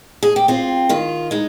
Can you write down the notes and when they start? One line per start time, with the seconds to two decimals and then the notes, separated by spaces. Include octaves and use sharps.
0.23 G#4
0.36 G4
0.48 C4 F4
0.89 D#3 F4
1.31 G#3 D#4